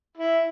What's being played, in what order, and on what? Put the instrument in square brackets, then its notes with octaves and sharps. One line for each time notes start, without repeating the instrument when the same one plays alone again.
[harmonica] E4